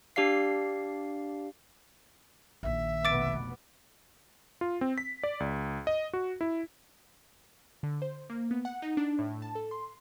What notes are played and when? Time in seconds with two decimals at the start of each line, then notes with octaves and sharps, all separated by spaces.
0.16 D4 G4 D5 F5 C7
2.63 A#1 D#3 E5
3.05 F1 B2 B3 D6 A6 D7
4.61 F4
4.81 C4
4.98 B6
5.24 D5
5.40 C#2
5.87 D#5
6.13 F#4
6.41 E4
7.83 D3
8.02 C5
8.30 A#3
8.51 B3
8.65 F#5
8.82 D#4
8.97 D4
9.19 A2
9.42 A5
9.55 A4
9.71 C6